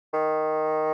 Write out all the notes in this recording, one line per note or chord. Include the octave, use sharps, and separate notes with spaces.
D#3